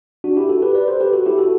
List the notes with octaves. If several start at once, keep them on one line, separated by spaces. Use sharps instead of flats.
D4 F#4
E4 G4
F#4 A4
G4 B4
B4 D5
A4 C5
G4 B4
F#4 A4
E4 G4
F#4 A4